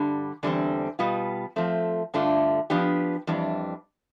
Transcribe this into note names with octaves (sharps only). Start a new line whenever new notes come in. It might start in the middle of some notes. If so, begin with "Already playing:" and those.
Already playing: G2 D3 G3
E2 D3 G3 C4
B2 G3 B3 F4
F3 A3 C4
G2 D3 A3 D4 F4
F3 B3 D4 G4
F2 E3 G3 D4